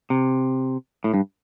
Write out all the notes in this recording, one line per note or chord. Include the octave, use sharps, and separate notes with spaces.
C3
A2
G2